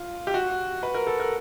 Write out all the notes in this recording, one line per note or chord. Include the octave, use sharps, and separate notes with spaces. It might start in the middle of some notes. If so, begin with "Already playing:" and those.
Already playing: F4
G4
F#4
B4
A#4
A4
A#4